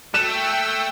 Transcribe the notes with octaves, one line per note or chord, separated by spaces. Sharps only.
A3 G5 E6 F#6 E7